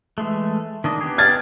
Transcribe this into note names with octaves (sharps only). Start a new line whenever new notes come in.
E3 G#3 A3
D#3 D4 D#5
B3 G4 G#4
F6 G#6 A6